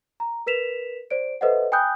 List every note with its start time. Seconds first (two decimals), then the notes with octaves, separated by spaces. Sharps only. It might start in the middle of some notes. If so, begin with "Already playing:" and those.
0.20 A#5
0.46 A#4 B4 B6 E7 F7
1.11 C5 D5 D7
1.41 A4 B4 C5 D#5 E5 F#5
1.72 G5 G#5 B5 D#6 F#6 G6